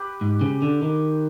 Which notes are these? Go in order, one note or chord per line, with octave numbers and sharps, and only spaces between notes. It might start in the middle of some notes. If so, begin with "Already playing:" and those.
Already playing: G4 B4
G#2
C#3
D3
D#3